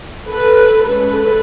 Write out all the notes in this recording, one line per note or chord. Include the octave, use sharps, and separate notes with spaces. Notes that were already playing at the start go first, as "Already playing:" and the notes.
A4 B4
G#3 C#4 A4 B4